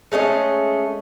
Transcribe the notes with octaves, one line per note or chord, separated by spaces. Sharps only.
G#3 A3 C#4 D#5